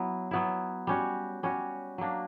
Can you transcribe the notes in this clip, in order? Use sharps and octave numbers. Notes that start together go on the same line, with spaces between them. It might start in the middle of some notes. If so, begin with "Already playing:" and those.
Already playing: F#3 B3 E4
F#3 B3 E4
G3 C#4 F#4
G3 C#4 F#4
F#3 A#3 D4